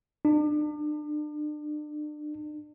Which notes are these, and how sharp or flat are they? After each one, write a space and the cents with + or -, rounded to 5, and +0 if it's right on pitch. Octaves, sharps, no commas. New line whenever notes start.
D4 +35